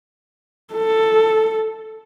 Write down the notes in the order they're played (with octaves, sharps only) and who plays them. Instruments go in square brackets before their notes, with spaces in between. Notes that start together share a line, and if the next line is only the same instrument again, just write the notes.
[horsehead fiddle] A4